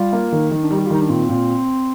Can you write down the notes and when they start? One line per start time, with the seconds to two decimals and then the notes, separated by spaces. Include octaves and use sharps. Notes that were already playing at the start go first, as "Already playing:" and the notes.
Already playing: G3 F4
0.13 A#3
0.32 D#3
0.51 D#3
0.63 D4
0.71 G3 D#4
0.79 G4
0.86 F4
0.90 D#3 D#4
1.02 D4
1.09 A#2 C4
1.29 A#2